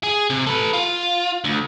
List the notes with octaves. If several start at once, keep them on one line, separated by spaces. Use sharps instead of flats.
G#4
C3
A4 B4
F4
D2